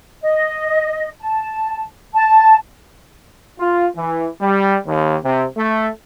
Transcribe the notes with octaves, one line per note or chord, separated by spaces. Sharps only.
D#5
A5
A5
F4
E3
G3
D#2
C3
A3